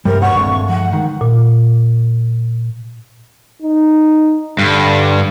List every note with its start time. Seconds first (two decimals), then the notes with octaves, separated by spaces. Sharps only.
0.05 G2 C3 G3 A#4
0.22 B1 F#5 C#6
0.35 D#1 G2 G#3 A3 C4
0.69 F3 F#5
0.92 D#3 G#3
1.21 A#2
3.62 D#4
4.59 G2 D3